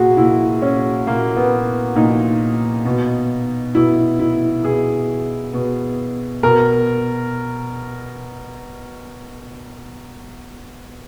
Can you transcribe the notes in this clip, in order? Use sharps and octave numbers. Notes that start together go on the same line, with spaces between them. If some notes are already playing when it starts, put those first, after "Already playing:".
Already playing: A#2 F#4 G#4
A#2 E4
C#4
A#2 A#3
B3
A#2 D#4
B2
B2 E4
E4
B2 G#4
B2
B2 A#4